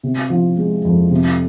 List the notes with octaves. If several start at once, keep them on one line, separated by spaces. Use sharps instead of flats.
C3
F3
G#3
F2
C3